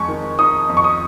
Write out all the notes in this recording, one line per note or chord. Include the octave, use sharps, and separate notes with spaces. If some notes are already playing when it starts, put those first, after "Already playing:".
Already playing: F2 G#3 C#6
D#3
D#4 D#6
F2
C#6
D#6